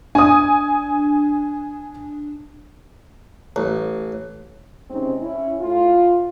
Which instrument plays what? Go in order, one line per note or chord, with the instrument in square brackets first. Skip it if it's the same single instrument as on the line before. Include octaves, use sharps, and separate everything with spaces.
[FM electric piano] D4 [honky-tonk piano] G#5 D#6
[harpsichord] A1
[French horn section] C3 G#3 C4 C#4 D#4
C#4 E4
A2 F4